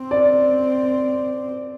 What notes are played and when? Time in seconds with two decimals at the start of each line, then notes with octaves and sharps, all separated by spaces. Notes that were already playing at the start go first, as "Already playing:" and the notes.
Already playing: C4
0.11 D5